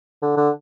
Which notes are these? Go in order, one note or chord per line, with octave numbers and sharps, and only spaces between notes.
D3
D3